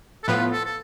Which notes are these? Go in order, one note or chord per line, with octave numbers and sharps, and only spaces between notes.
A4
A2 F3 B3 F4 B4
A4
A4